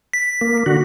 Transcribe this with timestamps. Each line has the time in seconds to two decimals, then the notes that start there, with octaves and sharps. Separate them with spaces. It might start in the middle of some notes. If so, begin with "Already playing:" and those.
0.13 B6
0.41 A#3
0.66 D3 F#4